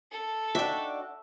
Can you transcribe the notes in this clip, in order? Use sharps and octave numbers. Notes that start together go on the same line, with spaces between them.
A4
D4 D#4 F#4 D5 E5 G5